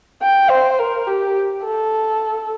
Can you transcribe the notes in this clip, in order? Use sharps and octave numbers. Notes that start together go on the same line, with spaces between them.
G5
C5
A#4
G4
A4